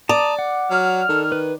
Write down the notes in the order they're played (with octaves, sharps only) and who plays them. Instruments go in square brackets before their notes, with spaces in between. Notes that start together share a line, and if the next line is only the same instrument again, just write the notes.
[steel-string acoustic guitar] D5 [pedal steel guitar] A5 A#5 D#6
[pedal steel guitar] F#5
[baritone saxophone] F#3 [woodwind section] F6
[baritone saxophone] D#3 [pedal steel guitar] A4
[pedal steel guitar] B4